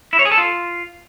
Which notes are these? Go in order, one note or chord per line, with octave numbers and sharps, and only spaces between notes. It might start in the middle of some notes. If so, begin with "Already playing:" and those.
E4
C#5
G#4
A4
F4